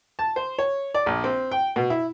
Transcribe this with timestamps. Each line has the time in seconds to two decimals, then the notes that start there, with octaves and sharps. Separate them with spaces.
0.19 A5
0.36 C5
0.58 C#5
0.94 D5
1.06 A#1
1.24 C4
1.51 G5
1.76 B2
1.90 E4